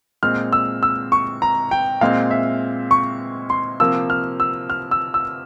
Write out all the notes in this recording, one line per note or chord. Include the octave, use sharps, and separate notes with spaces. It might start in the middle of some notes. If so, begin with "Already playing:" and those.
A#2 G#3 C4 F6
E6
E6
C#6
A#5
G5
A#2 G#3 C4 F5
E5
C#6
C6
C3 F3 A#3 E6
F6
E6
F6
E6
E6